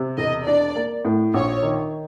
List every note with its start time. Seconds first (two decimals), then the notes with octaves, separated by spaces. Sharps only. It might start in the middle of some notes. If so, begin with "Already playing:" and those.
Already playing: C3
0.18 E1 D#5
0.47 D4 D5
0.76 A#3
1.05 A2
1.34 A#1 C#5
1.63 D#3